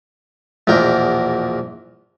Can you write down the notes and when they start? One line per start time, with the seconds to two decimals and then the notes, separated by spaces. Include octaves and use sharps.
0.67 A#1 E2 B2 A#4 G5